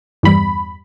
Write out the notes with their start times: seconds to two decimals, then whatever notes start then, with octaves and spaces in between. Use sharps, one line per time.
0.23 E2 G2 G3 B5